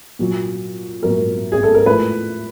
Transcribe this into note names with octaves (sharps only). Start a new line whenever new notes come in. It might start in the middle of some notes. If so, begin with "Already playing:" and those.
A#2 F#3
A#2 F#3 A#4
G#4
A4
A#4
A2 F3 B4